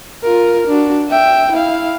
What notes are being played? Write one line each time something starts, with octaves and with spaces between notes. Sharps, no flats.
F4 A#4
D4 F#4
E5 G5
E4 F5